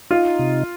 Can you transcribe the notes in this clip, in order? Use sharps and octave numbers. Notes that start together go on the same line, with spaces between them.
D#4 F4
C3